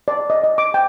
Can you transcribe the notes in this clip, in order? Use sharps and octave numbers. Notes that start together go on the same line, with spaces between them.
D5
D#5
D#5
D6
G5